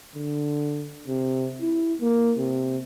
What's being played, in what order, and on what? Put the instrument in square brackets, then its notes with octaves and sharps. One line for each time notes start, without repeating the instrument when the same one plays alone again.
[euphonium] D3
C3
E4
A#3
C3